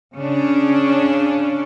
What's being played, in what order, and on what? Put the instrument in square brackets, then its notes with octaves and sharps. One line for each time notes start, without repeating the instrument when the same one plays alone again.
[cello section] C#3 C#4 D4